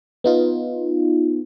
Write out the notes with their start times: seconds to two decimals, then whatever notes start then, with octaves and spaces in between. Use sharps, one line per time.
0.24 B3 D#4 F4